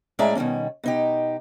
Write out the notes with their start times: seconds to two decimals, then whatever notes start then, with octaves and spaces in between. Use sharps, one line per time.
0.19 A2 G#3 C#4 D5 E5 A#5
0.35 B2 D#3 G3 A#3 C#4
0.84 B2 D#4 G4